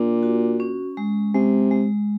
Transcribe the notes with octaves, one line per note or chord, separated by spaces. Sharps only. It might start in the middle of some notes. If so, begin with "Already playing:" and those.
Already playing: A#2 D4
F#4
C#4
G#3
C3 G#3
G#3